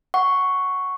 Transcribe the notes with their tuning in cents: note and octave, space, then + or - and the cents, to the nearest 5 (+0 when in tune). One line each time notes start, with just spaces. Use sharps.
F#5 +0 C#6 +0